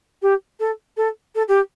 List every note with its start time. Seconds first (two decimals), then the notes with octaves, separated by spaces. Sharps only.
0.22 G4
0.60 A4
0.97 A4
1.35 A4
1.48 G4